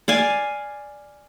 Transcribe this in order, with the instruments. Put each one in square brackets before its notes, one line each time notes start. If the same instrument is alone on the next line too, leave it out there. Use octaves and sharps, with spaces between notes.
[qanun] D5 F5 G#5